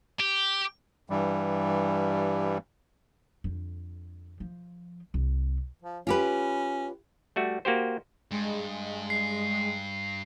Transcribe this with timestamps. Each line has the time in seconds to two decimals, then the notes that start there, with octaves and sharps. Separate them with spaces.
0.20 G4
1.10 G2 E3 G3
3.44 F2 D3
4.40 F3
5.14 C2
5.82 F3
6.07 C#4 F4 G4 B4
7.36 G3 A3 F#4 E5
7.65 A#3 F#4 G4 C5
8.31 G2 G#3
9.10 C7